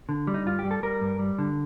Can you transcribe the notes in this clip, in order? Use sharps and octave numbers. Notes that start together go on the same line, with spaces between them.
D3
G3
D#4
G2 F4
G4
G3
A4
G3 A#4
G2
G3
D3